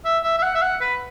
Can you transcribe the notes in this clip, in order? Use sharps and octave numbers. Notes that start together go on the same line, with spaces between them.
E5
E5
E5
F#5
E5
F#5
B4